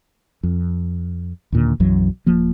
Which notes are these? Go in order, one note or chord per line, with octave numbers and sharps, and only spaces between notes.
F2
D#2 A#2 D3
B1 F#2 E3 F#3
D#1 F3 A#3